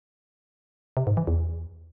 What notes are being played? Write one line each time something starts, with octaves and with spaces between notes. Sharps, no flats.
C3
G#2
E3
E2